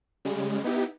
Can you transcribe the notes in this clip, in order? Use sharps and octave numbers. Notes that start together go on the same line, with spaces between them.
C#3 G3 G#3
B3 D#4 E4 G4